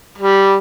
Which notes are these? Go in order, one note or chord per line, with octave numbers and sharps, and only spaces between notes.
G3